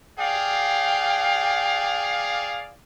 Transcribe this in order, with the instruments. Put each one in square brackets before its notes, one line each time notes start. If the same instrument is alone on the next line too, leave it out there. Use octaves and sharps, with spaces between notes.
[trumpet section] G#4 D5 F5 [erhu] G5